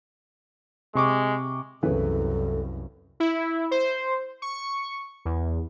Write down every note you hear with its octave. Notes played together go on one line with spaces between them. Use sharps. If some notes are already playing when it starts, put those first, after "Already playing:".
C3 G#3 C#6 D6
C2 F#2 C#3 E3 A4 B4
E4
C5
C#6
E2